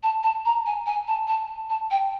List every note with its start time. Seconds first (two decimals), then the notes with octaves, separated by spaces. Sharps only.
0.03 A5
0.23 A5
0.45 A#5
0.66 G#5
0.86 G#5
1.08 A5
1.28 A5
1.70 A5
1.91 G5